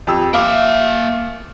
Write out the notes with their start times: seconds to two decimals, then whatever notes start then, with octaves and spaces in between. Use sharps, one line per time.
0.07 F2 G4 E6
0.34 A#3 E5 F5 D6